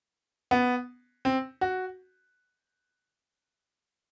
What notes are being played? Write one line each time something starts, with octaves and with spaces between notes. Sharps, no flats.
B3
C4
F#4